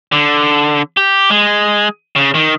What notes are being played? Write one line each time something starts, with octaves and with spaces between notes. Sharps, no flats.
D3
G4
G#3
C#3
D#3